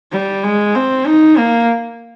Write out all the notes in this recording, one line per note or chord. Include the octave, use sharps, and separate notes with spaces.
G3
G#3
C4
D#4
A#3